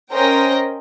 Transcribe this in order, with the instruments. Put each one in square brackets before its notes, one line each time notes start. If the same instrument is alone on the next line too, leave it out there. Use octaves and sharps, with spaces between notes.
[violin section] C#4 A#4 C5 D#5 G5 A#6